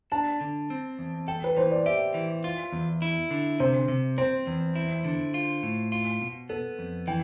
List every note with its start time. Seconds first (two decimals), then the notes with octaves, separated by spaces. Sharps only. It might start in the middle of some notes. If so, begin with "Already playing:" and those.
0.12 D4 A5
0.41 D3
0.70 C4
0.99 E2
1.28 A4 G5
1.44 B4
1.57 E3 C5
1.71 D5
1.86 G4 E5
2.14 E3
2.44 F4
2.73 E2
3.02 E4
3.31 D3
3.60 C3 C5
3.88 C3
4.18 C4 C5
4.47 E2
4.76 E4
5.05 D3
5.34 F4
5.63 A2
5.92 F4
6.21 B2
6.49 B3 A4
6.79 F2
7.07 E3 G5